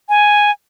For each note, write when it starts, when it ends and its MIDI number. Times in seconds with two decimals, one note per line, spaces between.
0.09 0.51 80